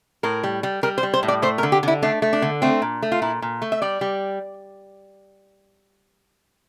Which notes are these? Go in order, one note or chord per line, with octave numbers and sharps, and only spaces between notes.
A2 A#4
G3
G3
G3 A#4
C5
G3
C5
A2
D5
A3 C5
A#4
D3
G4
D3 E4
A3 D4
A3
D4
D3
A3 C4
A#2
A3
F4
A#2 E4
A#2
A3
E5
G3 D5
G3